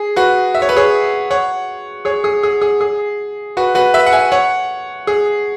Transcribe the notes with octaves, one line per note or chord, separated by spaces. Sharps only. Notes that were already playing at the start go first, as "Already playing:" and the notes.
Already playing: G#4
F#4 B4
E5
C#5
B4
G#4 C#5
C#5 F#5
G#4 C#5
G#4
G#4
G#4
G#4
F#4 B4
F#4 B4
B4 E5
F#5
E5 G#5
C#5 F#5
G#4